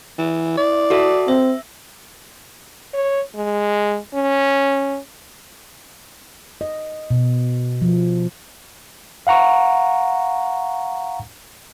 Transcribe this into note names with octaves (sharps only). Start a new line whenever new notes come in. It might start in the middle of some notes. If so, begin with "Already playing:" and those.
E3
E4 D5
F#4 A4 E5
C4 E5
C#5
G#3
C#4
D#5
B2
F3
F5 F#5 A#5 C#6